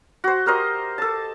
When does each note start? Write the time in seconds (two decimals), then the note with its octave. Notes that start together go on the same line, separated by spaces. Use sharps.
0.24 F#4 C5
0.46 G4 A#4 C5 D#5
0.98 A4 A5